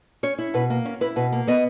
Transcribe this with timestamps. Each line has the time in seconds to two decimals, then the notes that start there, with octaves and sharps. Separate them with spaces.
0.23 C#4 C#5
0.38 E4
0.54 B2 B4
0.70 A#3
0.85 C#4
1.01 E4 B4
1.16 B2 B4
1.32 A#3
1.48 B3 D#5